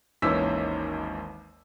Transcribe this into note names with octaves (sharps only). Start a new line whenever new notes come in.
G#1 D#2 E3 C#4 E6 B6